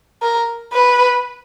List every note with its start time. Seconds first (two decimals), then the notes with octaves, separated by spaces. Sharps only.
0.22 A#4
0.73 B4